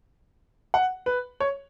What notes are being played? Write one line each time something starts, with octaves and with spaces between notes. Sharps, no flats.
F#5
B4
C#5